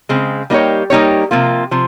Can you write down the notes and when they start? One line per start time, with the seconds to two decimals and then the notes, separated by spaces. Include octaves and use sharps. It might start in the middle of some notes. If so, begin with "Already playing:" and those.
0.09 C#3 G#3 C4
0.50 G3 A#3 D#4 G4 C#5
0.90 G3 A#3 D#4 G4 C#5
1.31 C3 F3 A#3 F4
1.71 C3 F3